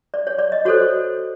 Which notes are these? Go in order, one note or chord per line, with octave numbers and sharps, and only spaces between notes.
D5
C#5
D5
D#5
F#4 A4 C5 C#5